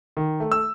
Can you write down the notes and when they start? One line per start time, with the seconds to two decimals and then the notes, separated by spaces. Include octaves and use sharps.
0.17 D#3
0.40 A3
0.52 E6